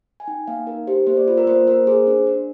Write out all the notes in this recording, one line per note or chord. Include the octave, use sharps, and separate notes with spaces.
G#5
D#4 G5
A#3 F5
D#4 A#4
G4 C5
A#3 C5
D5
F4 C5
A#4
A#3 C5
A#3 A#4
G#4 C5
D4
D4